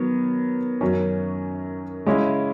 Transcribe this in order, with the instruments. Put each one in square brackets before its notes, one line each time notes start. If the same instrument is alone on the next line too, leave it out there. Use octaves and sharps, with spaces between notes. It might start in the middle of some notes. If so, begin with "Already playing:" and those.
Already playing: [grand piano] D#3 F#3 B3
F#2 D#3 F#3 C#4
C#3 G#3 C#4 E4